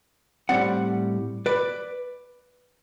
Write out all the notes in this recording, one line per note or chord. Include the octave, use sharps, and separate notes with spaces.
A2 G3 C4 D5 F#5
B4 D5